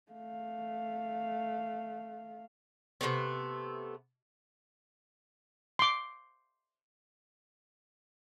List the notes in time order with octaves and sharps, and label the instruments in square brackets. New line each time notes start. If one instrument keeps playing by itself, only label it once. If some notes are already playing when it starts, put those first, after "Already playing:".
[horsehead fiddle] A3 F5
[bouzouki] C3 F3 A3 B3
[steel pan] C6 D6